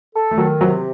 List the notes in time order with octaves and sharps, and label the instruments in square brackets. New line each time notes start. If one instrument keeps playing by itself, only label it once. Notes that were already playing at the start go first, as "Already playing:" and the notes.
[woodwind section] A4
[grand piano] A3
[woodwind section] D#3 [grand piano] F#3
[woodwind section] C3 [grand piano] F#3